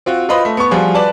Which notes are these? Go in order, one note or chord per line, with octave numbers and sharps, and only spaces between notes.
C4 F4 F#4
F4 B4 C5 D#5 B5
A3
B3 C#6
F3 G3 F4 F#4 G#4
B4 D5 A5